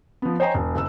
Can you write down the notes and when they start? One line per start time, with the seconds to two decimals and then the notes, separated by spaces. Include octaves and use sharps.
0.22 F3 B3
0.40 C5 C#5 D#5 G5 G#5 A#5
0.54 E1
0.75 F#1 E6